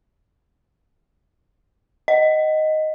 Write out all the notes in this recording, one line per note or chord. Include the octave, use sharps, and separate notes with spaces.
D#5